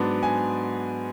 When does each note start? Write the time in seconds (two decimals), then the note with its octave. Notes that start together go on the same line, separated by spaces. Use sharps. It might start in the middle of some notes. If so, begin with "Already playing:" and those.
Already playing: G#2 F#3 B3 D4 A5
0.23 G#5